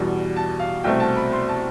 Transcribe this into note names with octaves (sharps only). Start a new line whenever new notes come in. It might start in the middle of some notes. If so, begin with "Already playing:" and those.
Already playing: E2 B2 G3
A5
F5
C2 B2 A3 C4 G5
A5
B5
C6
A5